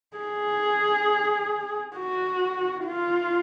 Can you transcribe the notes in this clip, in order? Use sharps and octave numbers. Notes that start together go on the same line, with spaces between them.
G#4
F#4
F4